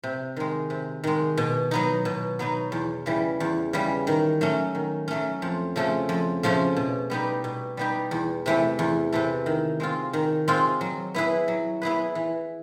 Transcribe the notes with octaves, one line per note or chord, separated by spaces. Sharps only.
C3
D#3 G#3
C3
D#3 G#3
B2
F#3 B3 D#4
B2
F#3 B3 D#4
E2
C#3 E3 G3
E2
C#3 E3 G3
D#3
F#3 A3 C#4
D#3
F#3 A3 C#4
F2
C#3 F3 A3 C#4
F2
C#3 F3 A3 C#4
B2
G3 B3 D#4 G4
B2
G3 B3 D#4 G4
E2
C3 E3 A3
E2
C3 E3 A3
D#3
G#3 C4 F4
D#3
G#3 C4 F4
F#3
B3 E4 G#4 B4
F#3
B3 E4 G#4 B4
E3